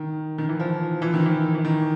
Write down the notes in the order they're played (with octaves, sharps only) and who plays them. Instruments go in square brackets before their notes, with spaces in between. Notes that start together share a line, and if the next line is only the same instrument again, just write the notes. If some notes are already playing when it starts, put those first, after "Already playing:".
Already playing: [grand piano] D#3
D#3
E3
F3
E3
D#3
E3
E3
D#3